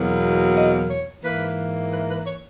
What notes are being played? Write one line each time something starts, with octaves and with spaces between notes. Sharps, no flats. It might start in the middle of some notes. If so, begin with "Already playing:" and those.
Already playing: E2 B2 F#3 A#3
D#5
C#5
G#2 E3 A#3 B4
B4
B4
C#5